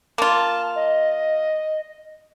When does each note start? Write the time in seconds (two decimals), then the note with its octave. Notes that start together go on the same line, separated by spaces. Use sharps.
0.18 A#3 F4 A5
0.76 D#5